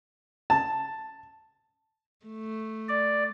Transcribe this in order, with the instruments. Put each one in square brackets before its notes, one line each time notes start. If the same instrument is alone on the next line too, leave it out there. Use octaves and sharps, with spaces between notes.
[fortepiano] A5
[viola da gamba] A3
[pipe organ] D5